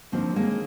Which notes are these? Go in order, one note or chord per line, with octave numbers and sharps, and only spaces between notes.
D#2 D3 F3 A#3 C4
G#3 A#3